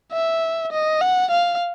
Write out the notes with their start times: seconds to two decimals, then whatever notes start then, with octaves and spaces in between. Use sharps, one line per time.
0.12 E5
0.72 D#5
1.01 F#5
1.30 F5